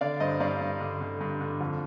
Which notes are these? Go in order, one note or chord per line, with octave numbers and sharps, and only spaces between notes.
D3 D5 F5
G2 C5 D#5
G2 D5 F5
G2
D3
D3
G2
D3
F2